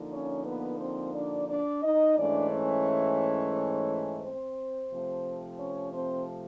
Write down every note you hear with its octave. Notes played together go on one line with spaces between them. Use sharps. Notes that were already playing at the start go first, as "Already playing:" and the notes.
Already playing: D3 F3 A#3 D#4
C#4 C#5
B3 B4
C4 C5
D4 D5
D4 D5
D#4 D#5
G#2 E3 A3 C#4 D4 D5
C#4 C#5
C4 C5
C3 F3 A3 C4
C#4 C#5
C4 C5